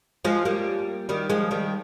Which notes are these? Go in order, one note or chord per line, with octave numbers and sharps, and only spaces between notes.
F3 G#3
G3 A#3
D#3 G3
F3 G#3
D#3 G3